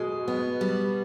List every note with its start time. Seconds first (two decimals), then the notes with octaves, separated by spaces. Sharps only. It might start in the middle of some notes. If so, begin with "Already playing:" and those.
Already playing: B2 G#3
0.28 B3
0.61 G3